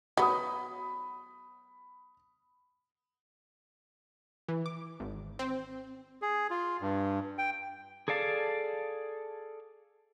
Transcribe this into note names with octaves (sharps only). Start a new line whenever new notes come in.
F#3 B3 B5 D#6
E3
D6
G#1
C4
G#4
F4
G2
G5
G#4 A4 D5 F5 A5